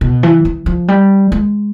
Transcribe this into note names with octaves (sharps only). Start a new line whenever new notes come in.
B2
E3
E3
F3
G3
G#3